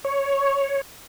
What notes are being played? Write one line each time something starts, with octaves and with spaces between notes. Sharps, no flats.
C#5